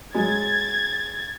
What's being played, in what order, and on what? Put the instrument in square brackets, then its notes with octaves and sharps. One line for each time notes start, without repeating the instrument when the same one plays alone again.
[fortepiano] F#3 G#3 [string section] G#6 A6